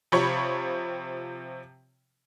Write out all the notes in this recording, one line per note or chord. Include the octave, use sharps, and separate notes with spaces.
C3 F3 C4 C#5 B5 C#6